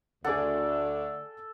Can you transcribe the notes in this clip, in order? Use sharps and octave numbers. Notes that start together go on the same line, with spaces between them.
D2 D3 A3 D4 G#4 A4 D5 F#5